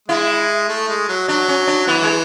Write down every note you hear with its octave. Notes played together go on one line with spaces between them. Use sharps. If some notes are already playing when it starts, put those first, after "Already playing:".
G#3 E4
A3
G#3
F#3
F#3 D4
C#4
D4
E3 B3
G#3